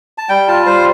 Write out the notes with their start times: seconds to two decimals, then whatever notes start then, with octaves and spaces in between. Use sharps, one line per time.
0.18 A5
0.29 G3 G5
0.48 F4 A5
0.66 G3 C5